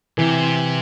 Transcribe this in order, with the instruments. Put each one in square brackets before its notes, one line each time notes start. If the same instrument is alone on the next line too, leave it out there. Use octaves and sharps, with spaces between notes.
[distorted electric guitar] C3 [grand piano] E3